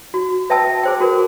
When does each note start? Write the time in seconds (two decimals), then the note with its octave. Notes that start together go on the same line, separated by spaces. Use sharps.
0.14 F#4
0.50 B4 E5 G5 A5 E6
0.83 G#4 C5 G5
1.00 F#4 A#4 B4